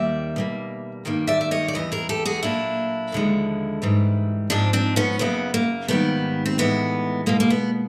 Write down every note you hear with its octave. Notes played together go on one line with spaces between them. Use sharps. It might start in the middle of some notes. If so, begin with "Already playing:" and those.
Already playing: D#2 D#3 G3 A#3 D5 E5
B2 G3 A#3
G2 D#3 G3 A#3
D5 E5
E5
C#5 D#5
D5
E2 C#3 E3 G3 D#5
G#4 A#4
G4 A4
F#4 G#4
A#2 F#3 A#3 D4 E4
D#2 D3 F3 G#3
G#2 E3 G3
G#2 F3 G#3 C4 D4
C4 D4
B3 C#4
F#2 C#3 F#3 A#3 B3
A#3
G#2 D#3 G3 A#3 B3
C4
A2 E3 G#3 B3
B2 G#3 A#3
A#3
B3